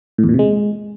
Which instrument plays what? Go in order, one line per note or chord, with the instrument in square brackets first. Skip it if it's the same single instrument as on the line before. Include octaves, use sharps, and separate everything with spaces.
[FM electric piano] A2
E2
A#2
C3
G#3